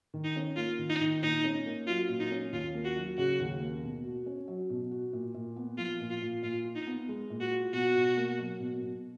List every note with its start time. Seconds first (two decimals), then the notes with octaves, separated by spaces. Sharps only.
0.14 D#3
0.24 D#4
0.36 C#4
0.57 A#3 F4
0.79 D#3
0.89 D#4
1.01 D#3
1.22 A#2 D#4
1.44 C#4
1.66 A#3
1.87 F#3 F4
2.09 A#2
2.20 D#4
2.31 C#4
2.52 D#2 F4
2.74 A#3
2.85 F#4
2.96 F#3
3.18 C#3 F#4
3.40 D#2
3.61 A#3
3.83 B2
4.04 F#4
4.26 C#4
4.48 F#3
4.70 B2
4.91 F#4
5.13 A#2
5.34 A#2
5.56 B3
5.78 F3 F4
6.00 A#2
6.10 F4
6.22 A#2
6.43 A#2 F4
6.65 F4
6.76 D#4
6.87 B3
7.08 G#3
7.30 A#2
7.41 F#4
7.51 F4
7.73 B2 F#4
7.95 B2
8.17 A#3
8.39 F#3
8.60 B2
8.82 B2